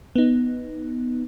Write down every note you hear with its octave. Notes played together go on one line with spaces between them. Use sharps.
B3 D#4